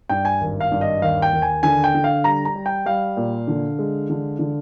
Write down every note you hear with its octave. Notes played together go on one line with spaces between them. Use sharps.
G2 G5
G#5
G#1
F5
G2
D#5
D#2 F5
G5
D#2
G#5
D3 G#5
G5
D3
F5
G3 A#5
A#5
G3
G5
G3 F5
A#2
D3
G#3
D3
D3